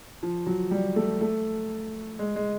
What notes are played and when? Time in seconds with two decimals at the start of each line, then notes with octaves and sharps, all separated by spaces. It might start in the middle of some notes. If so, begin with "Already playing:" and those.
0.23 F3
0.46 F#3
0.71 G3
0.96 A3
1.21 A3
2.19 G#3
2.36 G#3